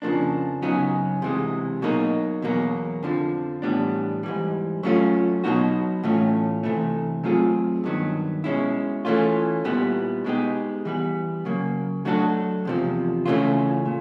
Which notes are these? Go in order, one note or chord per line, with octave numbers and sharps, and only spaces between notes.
F2 C#3 F3 A#3 D4
F#2 C#3 F#3 B3 D#4
C3 E3 G#3
B2 F#3 A#3 D#4
E2 B2 F#3 A#3
F2 D3 F3
A2 E3 G3 B3 D4
G#2 E3 G3
F#3 A3 C#4 F4
B2 F#3 B3 D#4 F#4
A2 E3 A3 C#4 F4
C3 E3 A3
F#3 A3 C4 F4 G#4
G2 D#3 F#3 B3
B2 G#3 C#4 E4
E3 A3 C#4 F4
A#2 G3 B3 E4
B2 G#3 B3 D#4 G4
E3 G3 B3
C#3 F#3 A#3
F#3 A3 D4 F#4 A4
E2 C3 F3
C#3 E3 A3 C#4 F4
A#2